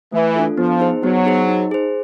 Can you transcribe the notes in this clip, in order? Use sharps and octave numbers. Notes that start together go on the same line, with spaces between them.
E3 A3
D4 F4 A4
F3 B3
D#4 G#4 C5
F#3 B3
D#4 G#4 C5
D#4
G#4 C5